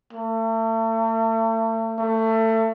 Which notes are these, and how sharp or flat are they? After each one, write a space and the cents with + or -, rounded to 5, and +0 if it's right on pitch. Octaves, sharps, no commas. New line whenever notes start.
A3 +35
A3 +25